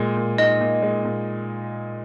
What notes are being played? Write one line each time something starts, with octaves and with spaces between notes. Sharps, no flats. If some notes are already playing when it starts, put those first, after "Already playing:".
Already playing: A#2 G#3
A#2
D#4 D#5
A#2
G#3
A#2